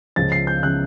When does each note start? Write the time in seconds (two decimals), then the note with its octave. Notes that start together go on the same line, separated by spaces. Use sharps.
0.16 C#2 C#3 F3 A6
0.32 C7
0.47 G6
0.63 C#3 F3 F#6